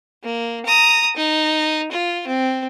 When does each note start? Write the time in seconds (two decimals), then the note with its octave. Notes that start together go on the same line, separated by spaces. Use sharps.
0.23 A#3
0.66 A#5 D#6
1.16 D#4
1.92 F4
2.27 C4